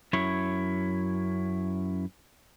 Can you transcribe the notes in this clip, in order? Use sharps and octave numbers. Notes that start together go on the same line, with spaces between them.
F#2 E4 C#5